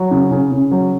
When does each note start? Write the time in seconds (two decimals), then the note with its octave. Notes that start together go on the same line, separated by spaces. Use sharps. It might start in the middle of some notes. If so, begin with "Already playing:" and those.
Already playing: F#3
0.11 C#3
0.31 C#3
0.51 C#3
0.71 F#3